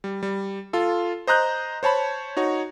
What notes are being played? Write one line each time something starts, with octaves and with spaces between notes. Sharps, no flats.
G3
G3
F4 A4
C5 D#5 A#5 F#6 G6
C5 C#5 A5 B5
D#4 F#4 C#5